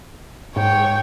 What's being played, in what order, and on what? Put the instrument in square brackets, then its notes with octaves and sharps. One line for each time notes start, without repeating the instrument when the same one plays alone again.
[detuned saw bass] G#2 [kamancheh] C#5 G5